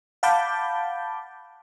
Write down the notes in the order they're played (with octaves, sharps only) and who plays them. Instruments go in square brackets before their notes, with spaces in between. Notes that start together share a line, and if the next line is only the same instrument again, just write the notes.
[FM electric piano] F5 F#5 A5 B5 D6 G6